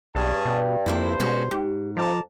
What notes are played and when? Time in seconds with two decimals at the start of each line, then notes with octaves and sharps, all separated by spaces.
0.15 B1 G2 C#4 G#4 A5
0.45 B2
0.86 F2 C3 A#3 E4 C5
1.20 B2 G#3 C#4 F#4
1.51 G#2 G4
1.97 F2 F3 A5 A#5 D6